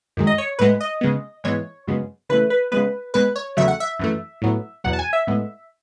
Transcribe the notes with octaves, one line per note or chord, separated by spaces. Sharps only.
F#2 D#3 G#3
D#5
C#5
A2 G#3 B3 B4
D#5
C#3 G#3 B3
G#2 E3 G#3 B3 C#5
F#2 C#3 G#3 B3
C#3 E3 A3 B4
B4
C#3 G#3 B3 B4
B2 G#3 B3 B4
C#5
E2 C#3 F#3 A3 E5
F#5
E5
F#2 E3 A3
A2 F#3 B3
E2 B2 F#3 F#5
A5
G#5
E5
A2 G#3 B3